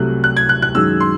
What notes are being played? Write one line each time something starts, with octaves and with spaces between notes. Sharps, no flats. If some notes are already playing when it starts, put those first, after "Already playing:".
Already playing: C2 C3 F#3 A3 F#6
F#6
G#6
F#6
F#6
F#2 D#3 G#3 E6
C6